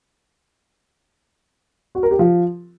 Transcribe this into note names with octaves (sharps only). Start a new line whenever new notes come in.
F#4
A#4
G4
F3